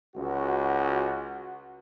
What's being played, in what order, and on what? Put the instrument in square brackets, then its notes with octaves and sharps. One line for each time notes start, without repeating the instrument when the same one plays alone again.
[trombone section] C#2 F#4